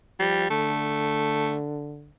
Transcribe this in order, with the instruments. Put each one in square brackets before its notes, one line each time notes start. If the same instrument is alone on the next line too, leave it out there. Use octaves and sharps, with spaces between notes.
[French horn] F3 [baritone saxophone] G3
[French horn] D3 [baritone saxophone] A3